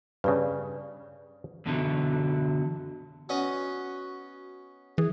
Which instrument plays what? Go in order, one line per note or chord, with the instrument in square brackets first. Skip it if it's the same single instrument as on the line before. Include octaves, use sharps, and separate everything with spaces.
[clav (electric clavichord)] G2 C#3 [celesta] B4 D5
[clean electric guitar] F#2 B2 D3 E3 F#3
[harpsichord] B3 C#4 D#5 [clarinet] F#4
[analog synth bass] E3 [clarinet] G#4